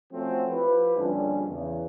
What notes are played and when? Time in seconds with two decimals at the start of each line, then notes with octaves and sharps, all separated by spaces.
0.12 F3 A3 C4 C#4 F#4
0.49 F3 E4 G4 B4
0.97 A#1 F2 D3 G3 C#4 D4
1.48 E2 C#3